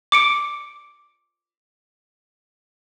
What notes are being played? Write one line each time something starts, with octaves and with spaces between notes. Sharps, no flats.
D6 C#7 D7